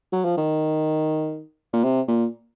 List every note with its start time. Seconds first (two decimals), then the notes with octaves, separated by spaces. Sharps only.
0.12 F#3
0.25 F3
0.37 D#3
1.73 A#2
1.84 C3
2.08 A#2